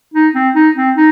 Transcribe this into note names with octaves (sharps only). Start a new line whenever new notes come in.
D#4
C4
D#4
C4
D#4